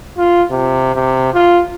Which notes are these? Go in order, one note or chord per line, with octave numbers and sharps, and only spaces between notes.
F4
C3
C3
F4